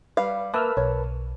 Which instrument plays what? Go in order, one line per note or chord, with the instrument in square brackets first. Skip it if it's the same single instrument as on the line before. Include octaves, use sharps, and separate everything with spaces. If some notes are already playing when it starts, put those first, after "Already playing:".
[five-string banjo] G3 F5 [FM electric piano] B4
[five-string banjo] A#3 [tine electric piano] A#4 B4 A5 [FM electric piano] E5 E6 F6
[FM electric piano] B1 [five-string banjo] C#5